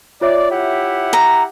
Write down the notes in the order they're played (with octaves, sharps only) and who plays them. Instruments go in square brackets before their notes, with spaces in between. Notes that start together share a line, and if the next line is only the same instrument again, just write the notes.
[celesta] F4 C#5 E5 [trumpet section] D5
[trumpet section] E4 G4 F#5
[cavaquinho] A#5